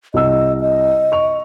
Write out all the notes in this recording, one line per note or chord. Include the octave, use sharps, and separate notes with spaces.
C2 D#5 E6
D#5
C#6 F7